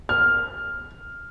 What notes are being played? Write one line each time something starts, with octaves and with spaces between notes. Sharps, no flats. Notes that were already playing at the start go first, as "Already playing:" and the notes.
F6